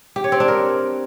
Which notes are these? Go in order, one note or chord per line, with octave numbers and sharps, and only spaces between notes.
G4
C#5
C4
D4
A#4